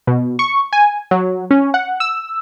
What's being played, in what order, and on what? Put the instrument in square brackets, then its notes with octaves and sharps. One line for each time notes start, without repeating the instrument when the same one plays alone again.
[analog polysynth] B2
C#6
G#5
F#3
C#4
F#5
E6